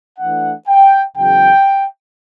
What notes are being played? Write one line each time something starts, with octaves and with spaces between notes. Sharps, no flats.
E3 A3 D4 F#5
G5
E2 C#3 F#3 G5